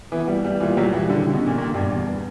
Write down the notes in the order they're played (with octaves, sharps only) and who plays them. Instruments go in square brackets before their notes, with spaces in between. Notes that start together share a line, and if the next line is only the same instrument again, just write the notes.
[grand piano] E3 [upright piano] B3
[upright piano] G3
G3
[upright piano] A#2 [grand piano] E3
[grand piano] F#3 [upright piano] G3
[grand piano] E3 [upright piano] G3
[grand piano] D3 [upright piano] G4
[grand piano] C#3
[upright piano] D3
[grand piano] B2
[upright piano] D3
[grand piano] A#2
[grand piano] A#2 [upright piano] G4
[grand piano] G2 [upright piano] G3
[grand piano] E2 [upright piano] G3
[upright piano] B3